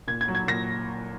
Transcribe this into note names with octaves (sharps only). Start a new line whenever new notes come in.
A#2 G#6
G#6
F#3
G#6
A#2 A#6